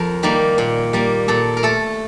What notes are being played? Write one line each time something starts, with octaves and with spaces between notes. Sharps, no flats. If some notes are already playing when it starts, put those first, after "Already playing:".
Already playing: F2 A#4
D#3 G3 A#3
A#2
G3 A#3
A#2 A4
A#4
A3 A4